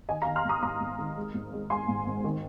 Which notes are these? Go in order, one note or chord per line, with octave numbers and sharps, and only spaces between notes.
D#3 D#5 G#5
F5 A#5
D#3
C6 F6
G#1 A#5 D#6
G#1 A#5 D#6
G#1
D#3
G#3
G#1
G#3
G#3 G#5 C6
G#2
G#1
D#3